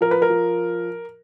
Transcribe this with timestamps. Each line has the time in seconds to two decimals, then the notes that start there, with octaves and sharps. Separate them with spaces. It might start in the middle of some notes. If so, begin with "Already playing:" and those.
0.01 F3 A#4
0.11 B4
0.22 A#4
0.30 F3